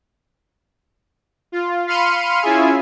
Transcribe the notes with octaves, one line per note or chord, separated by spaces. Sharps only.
F4
F5 B5 C6 F6 C#7 D#7
C#4 E4 F4 G#4 E5 G#5